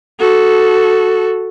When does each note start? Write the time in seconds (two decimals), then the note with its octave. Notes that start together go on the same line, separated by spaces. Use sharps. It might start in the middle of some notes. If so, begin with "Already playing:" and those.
0.20 F#4 A4